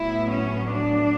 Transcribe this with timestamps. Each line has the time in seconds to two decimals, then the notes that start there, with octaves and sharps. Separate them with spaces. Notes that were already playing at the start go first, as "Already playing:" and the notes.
Already playing: A2 F#3 B3 E4
0.30 C#4
0.72 D4